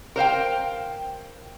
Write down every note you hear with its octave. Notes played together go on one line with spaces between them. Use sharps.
A#4 C5 F5 G5